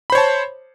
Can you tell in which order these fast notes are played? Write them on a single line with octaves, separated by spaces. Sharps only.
B5 C5 C#5 A5